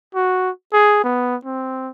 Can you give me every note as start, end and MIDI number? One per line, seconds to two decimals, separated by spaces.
0.15 0.50 66
0.73 1.01 68
1.04 1.36 59
1.45 1.91 60